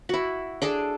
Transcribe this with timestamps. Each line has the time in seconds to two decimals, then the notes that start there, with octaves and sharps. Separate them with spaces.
0.09 E4 F#4
0.62 D4 G#4 A4